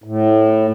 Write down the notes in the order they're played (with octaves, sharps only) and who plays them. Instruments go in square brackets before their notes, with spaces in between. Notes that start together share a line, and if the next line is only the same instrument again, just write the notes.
[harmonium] A2